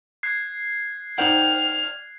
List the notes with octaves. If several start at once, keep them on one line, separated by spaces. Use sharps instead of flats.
F#6 G#6 C7
D#4 C5 D5 F#5 G5 F6